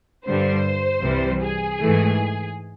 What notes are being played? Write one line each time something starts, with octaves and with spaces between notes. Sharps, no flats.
G2 D3 G3 C5
C2 C3 E3 G3
G#4
G#2 E3 A3